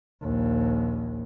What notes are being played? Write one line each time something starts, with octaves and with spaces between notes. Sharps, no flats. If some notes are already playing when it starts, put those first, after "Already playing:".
A#1 D#2